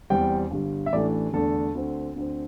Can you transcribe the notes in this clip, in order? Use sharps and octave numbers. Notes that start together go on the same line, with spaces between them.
E2 E3 G3 C4 G5
G1 G2 G3
E5
A1 A2 E3 A3 D4 D5
E2 D3 A3 D4 A4
D2 D3 C4
D2 D3 C4